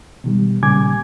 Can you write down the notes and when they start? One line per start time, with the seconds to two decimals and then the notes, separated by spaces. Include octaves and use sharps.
0.24 B2 D#3 G3
0.63 A#2 C#3 G3 G#5 D6 G#6